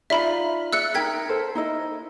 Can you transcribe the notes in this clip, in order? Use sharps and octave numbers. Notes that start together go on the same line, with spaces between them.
D#4 F4 D5 E5 B5
D5 E5 E6 F#6 C#7
D#4 A#4 G5 G#6 B6
A4 A#4 C5
D#4 E4 D#5